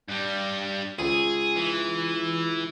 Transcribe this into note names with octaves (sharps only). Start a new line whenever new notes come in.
G2 G3
C#2 G#4
E3